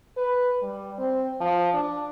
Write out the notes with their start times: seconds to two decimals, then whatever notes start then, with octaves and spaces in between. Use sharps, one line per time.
0.17 B4
0.63 G3
0.98 C4
1.41 F3
1.74 D4